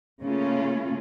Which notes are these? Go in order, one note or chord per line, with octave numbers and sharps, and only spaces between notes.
C#3 A3 A#3 C#4 F4